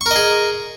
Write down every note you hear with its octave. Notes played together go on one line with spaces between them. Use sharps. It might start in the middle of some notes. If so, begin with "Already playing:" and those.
G#4 A#4 D#5 C#6